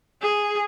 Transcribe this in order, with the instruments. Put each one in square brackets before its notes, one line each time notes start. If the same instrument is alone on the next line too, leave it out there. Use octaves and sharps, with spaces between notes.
[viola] G#4